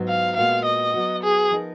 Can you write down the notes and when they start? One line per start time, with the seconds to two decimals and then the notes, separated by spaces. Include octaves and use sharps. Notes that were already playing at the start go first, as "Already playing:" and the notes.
Already playing: G#2 F#3 B3 F4
0.08 F5
0.37 A#2 G#3 B3 F#4 F5
0.65 D#5
0.94 F#3 B3 F#4
1.23 G#4
1.51 F3 B3 D#4 A#4